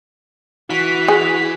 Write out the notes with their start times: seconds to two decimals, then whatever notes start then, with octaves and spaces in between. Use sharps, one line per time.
0.70 E3 F#4 B6
1.08 G#4